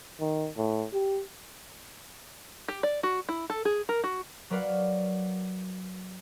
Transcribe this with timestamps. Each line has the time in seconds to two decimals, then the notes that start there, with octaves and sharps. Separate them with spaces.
0.20 D#3
0.57 A2
0.93 G4
2.68 G4
2.83 D5
3.03 F#4
3.29 E4
3.50 A4
3.65 G#4
3.89 A#4
4.04 F#4
4.50 F#3 A#4 B4 D5 F5 F#5